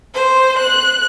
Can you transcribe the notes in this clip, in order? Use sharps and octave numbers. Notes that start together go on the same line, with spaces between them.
C5
F#6